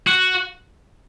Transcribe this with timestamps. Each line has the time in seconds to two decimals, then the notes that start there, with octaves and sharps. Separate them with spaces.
0.07 F#4